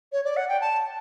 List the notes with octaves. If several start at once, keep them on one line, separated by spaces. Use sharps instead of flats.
C#5
D5
F#5
G5
A5